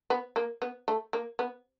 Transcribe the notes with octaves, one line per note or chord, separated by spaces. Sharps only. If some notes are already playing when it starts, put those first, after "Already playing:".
B3
A#3
B3
A3
A#3
B3